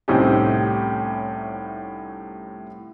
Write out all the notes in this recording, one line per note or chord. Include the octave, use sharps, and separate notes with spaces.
C2 A2 C4 C#4 D#4 G4